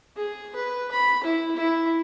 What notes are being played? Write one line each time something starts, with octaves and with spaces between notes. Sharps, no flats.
G#4
B4
B5
E4
E4